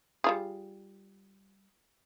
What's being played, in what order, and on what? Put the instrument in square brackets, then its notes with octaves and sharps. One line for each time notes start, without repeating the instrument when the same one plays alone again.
[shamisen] G3 F4 G#4